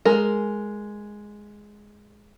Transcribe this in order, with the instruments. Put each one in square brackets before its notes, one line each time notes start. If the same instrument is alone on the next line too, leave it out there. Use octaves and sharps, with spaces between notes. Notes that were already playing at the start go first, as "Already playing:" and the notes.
[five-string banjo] G#3 A#4